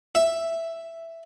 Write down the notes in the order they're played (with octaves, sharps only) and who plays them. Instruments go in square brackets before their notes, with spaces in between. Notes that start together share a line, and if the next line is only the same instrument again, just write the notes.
[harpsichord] E5